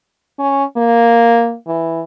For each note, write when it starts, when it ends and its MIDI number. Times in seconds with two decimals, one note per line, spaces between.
0.39 0.63 61
0.77 1.55 58
1.67 2.02 52